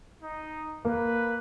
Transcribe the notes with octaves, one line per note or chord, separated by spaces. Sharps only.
D#4
A#3 B4